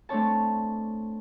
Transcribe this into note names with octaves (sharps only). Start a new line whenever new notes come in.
A3 C4 D4 C#5 A5